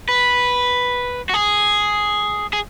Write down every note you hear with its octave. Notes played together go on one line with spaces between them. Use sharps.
B4
F#4
G#4
G#4